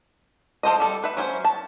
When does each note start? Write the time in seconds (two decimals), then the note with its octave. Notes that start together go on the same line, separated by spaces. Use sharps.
0.63 F3 A4 C5 D#5
0.80 G3 A4
1.04 B4 E5
1.17 F#3 C#4 C5
1.45 A5